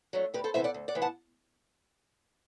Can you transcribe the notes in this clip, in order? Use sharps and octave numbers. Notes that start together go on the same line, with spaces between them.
F#3 A3 D4
D2 G4 B4
A4 C5
C3 E3 B3 C5 E5
D5 F#5
D2
D5 F#5
C3 E3 B3
F#5 A5